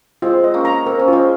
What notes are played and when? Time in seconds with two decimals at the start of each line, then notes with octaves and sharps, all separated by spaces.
0.22 G#3 C4 F4
0.44 D#5
0.54 A#3 C#4
0.65 A#5
0.86 C4 A#4
0.99 C#4
1.08 G#3 C4 F4